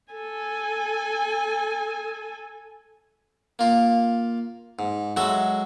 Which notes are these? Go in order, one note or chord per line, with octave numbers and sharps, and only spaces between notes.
A4 G#5
A#3 F4
G#2
F#3 G#3 F#4 A4 E5